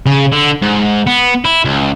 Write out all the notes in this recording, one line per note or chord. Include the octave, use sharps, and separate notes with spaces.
C#3
D3
G#2
B3
E4
C#2